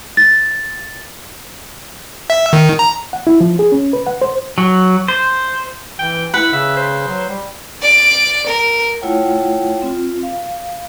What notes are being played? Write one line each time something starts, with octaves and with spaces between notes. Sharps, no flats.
A6
E5
D#3
A#5
F#5
E4
F3
G#4
C#4
B4
F#5
C5
F#3
C5
E3 G5
E4 B4 F#5
C#3 E5
C5
F#3
G3
D5 D7
A#4
A3 E4 F4 C#5 F#5 G5
C4 F4
F5